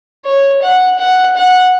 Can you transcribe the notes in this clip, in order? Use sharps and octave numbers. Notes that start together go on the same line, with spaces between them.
C#5
F#5
F#5
F#5